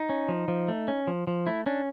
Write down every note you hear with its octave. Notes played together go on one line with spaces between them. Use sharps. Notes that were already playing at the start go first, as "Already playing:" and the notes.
Already playing: D#4
C#4
F3
F3
A3
C#4
F3
F3
A3 E4
C#4 D4